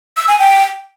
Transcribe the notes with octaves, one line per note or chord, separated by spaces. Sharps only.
E6
G#5
G5